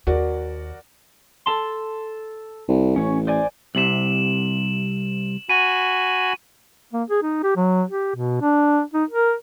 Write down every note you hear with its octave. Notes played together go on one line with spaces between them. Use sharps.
D#2 F#4 A#4 D5
A4 A5 C6
C2
A1 C#4 C#5
C5 D5 G#5
C2 C3 E7 F#7
F#4 G#5 B5 D#7
A#3
G#4
D#4
G4
F#3
G4
B2
D4
D#4
A#4